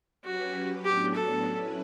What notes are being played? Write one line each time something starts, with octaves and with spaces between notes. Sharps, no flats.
F#3 C#4 F#4 G4 B4
A2 F#3 B3 D4 F#4 G4
A4
F#3 C#4 E4 B4